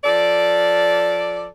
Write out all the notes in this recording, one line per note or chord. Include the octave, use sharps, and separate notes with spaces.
F3 A4 D5